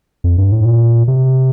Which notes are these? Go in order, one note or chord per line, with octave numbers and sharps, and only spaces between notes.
F2
G2
A2
A#2
C3